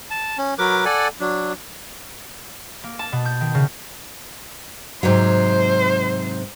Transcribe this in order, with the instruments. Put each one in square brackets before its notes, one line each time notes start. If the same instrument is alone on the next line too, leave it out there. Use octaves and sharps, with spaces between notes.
[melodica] A5
C#4
F#3 A#4 B4 D6
A4 D5 F#5 G#5
F#3 D4
[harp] A#3
A5
B2
G6
D#3
C#3
[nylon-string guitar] G#2 C3 F#3 [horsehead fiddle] C5